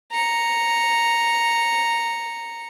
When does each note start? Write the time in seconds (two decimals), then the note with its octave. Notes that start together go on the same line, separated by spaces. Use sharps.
0.12 A#5 C#7